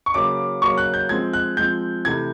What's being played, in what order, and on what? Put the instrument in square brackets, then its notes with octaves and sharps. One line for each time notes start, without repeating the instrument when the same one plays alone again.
[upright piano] C#6
C#3 F#3 A#3 D6
C#3 F#3 A#3 C#6
F#6
G6
F3 G#3 C4 G#6
F#6
F3 G#3 C4 G6
C3 E3 A3 G#6